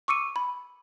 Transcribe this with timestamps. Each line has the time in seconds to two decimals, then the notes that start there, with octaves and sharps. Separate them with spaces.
0.08 C#6 D6 E6 C#7 D#7
0.36 B5